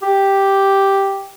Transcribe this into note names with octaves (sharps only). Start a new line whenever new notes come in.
G4